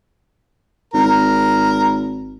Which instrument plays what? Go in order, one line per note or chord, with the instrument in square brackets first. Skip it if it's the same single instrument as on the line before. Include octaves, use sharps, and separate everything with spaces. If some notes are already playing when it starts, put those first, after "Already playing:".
[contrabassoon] G#1 [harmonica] A#4